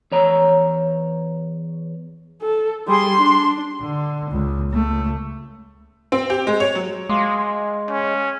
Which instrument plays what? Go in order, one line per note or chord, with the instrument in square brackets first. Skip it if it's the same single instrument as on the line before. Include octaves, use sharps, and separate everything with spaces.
[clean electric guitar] E2 C#5 A#5
[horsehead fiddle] A4
[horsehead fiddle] G3 G#4 [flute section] C6
[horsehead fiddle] D4
[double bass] D3
C#2
C#2 A3
[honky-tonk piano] C4
G4
G#3
C#5
F#3
[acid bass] G#3 [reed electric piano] F5 C6 D6
[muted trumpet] C#4